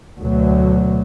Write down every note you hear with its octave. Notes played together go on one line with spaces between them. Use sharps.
D2 B2 F#3